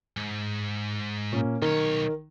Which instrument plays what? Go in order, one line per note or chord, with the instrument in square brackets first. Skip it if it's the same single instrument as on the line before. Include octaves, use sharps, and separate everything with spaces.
[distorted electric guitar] G#2
[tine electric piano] A#2 [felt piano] A#3 C#4
[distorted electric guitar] B1 C#5 [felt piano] D#3 [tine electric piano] A#4